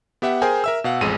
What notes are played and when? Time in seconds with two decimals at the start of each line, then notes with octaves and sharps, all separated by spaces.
0.22 B3 G4 E5 F#5
0.42 G#4 A#4 C5 G5 G#5
0.64 A#4 E5 E6
0.84 B2 F5 F#5
1.01 A1 F2 G#3 D#7